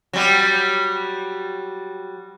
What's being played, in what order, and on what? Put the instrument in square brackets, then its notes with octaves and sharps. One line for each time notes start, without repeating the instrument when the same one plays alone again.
[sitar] F#3 G3